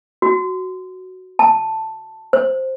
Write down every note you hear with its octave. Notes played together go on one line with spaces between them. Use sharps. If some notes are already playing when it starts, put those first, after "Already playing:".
F#4
A5
C5